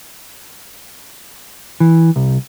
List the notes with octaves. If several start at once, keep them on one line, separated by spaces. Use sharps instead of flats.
E3
C2